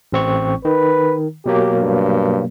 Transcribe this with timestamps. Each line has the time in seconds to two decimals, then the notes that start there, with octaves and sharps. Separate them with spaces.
0.12 A1 C4 C#6
0.65 D#3 B4
1.46 B2 F#3 A#3 G4
1.79 G2